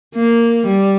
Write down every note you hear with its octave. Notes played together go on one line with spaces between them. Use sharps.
A#3
G3